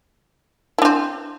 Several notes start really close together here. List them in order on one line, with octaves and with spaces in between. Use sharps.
E4 D4 C4